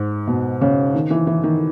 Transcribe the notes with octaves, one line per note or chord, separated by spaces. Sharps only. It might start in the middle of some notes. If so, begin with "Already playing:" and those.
Already playing: G#2
B2
C#3
D#3
E3
E3
D#3